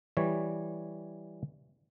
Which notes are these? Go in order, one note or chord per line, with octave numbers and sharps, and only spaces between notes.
E3 G3 C#5